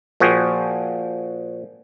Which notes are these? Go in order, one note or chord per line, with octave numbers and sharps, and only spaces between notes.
A#2 F3 F#4 G#4 G5